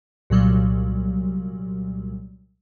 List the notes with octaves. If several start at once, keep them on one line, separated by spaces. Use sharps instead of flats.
C2 A#2 F#3 G3